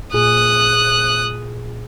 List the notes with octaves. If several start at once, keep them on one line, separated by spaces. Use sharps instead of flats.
A#2 G#4 D#6 F#6